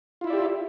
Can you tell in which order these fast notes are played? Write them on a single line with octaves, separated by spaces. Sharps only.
F4 E4 E5 D5 G4